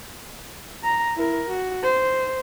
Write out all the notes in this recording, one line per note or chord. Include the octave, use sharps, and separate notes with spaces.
A#5
E4 A#4
F#4
C5